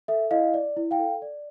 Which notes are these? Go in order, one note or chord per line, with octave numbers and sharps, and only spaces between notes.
A4 E5
E4 D#5 F5
D5
E4
F5 G5
A4
D5